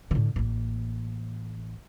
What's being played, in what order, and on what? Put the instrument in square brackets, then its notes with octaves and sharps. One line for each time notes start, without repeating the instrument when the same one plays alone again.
[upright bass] A2 D3
A1 A#3